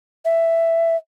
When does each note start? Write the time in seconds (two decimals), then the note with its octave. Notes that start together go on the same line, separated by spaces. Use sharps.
0.25 E5